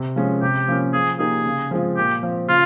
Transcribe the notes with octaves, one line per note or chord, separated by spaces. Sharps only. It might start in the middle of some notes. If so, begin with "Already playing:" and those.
Already playing: C3
F3 G#3 C#4
C3 G4
F3 A#3 C#4
F3 G#4
A#3 D#4 G4 G#4
C#3
F3 G#3 C4 F4
A#2 G4
F3 C4
C#3 F4